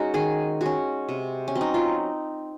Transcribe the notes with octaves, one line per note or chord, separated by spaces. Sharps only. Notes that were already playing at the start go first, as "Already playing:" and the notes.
Already playing: G#3 C#4 D#4 F#4
D#3 G#4
G#3 C#4 F#4
C3
C#4
F#3 C4
D#4
F4